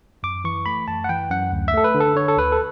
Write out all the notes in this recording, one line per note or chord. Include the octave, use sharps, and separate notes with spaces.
F#2 D6
E3 C#6
A3 B5
F#2 A5
F#5
E3 G5
F#2 F#5
D2
E5
A3 A4
B4
D3
A4
D3 C#5
A4
D2 B4
A4